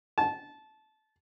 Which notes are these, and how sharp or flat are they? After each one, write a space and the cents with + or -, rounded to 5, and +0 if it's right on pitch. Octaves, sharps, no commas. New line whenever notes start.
A5 -20